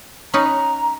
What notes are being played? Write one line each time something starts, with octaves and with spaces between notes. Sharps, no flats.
C#4 D#4 B4 A#5